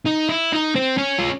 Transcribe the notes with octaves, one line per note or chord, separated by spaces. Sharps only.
D#4
E4
D#4
C4
C#4
F4